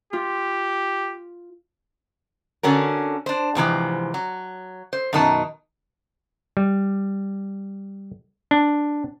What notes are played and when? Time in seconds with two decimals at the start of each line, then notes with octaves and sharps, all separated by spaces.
0.13 F4 G4
2.63 D3 C#4 F#4 A#4
3.26 D4 C5
3.55 G#2 C3 E3 F3
4.14 F#3
4.93 C5
5.13 F#2 B2 D#3 D#4 A5
6.57 G3
8.51 D4